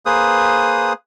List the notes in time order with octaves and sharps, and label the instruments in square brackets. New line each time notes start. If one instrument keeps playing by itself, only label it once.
[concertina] A#3 G#4 B4 C5 D#6